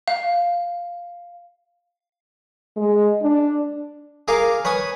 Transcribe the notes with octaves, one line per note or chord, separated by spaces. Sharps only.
F5
G#3
D4
G#4 A#4 F5 D6
B4 C#5 G#5 D#6